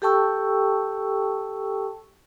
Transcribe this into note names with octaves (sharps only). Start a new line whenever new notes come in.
G4 A4 G5 A5 C#6 E6